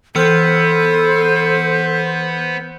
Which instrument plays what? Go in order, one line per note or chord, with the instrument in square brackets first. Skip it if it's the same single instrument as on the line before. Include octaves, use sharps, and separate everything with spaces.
[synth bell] E3 E6 F6 [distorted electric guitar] B3 [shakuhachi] A4 [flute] C5